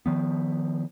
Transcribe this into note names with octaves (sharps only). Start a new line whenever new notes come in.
D#3 F3 B3